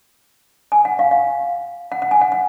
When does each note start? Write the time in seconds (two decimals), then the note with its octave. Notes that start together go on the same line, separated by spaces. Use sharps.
0.72 G#5
0.85 F#5
0.99 F5
1.11 F5
1.92 F#5
2.02 F#5
2.11 G#5
2.21 F#5
2.32 F#5